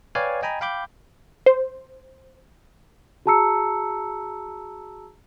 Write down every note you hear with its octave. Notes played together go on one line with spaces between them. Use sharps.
B4 C#5 D5 F5 G5 G#5
D#5 G5 G#5 A#5 B5
F5 G5 B5 D6 G6
C5
F#4 G#4 A5 A#5 E6 C#7